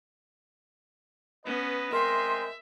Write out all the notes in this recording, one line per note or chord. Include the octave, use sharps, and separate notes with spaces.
B3 C#4 B4 D#5
G#3 C4 A#4 D#5 E5 C6